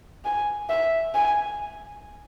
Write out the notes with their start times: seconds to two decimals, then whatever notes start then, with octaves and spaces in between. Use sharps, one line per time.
0.25 G#5
0.70 E5
1.15 G#5